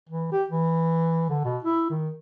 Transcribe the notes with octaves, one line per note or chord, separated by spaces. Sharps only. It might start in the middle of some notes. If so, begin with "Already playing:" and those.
E3
G4
E3
D3
B2
E4
D#3